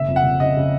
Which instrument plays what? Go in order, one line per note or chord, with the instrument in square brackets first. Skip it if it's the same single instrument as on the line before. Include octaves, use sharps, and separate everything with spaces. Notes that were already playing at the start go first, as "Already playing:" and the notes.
Already playing: [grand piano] F#1 [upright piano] E5
[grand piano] F2
[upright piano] F#5
[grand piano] F#1
[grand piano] C#3 [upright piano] D#5
[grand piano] C#3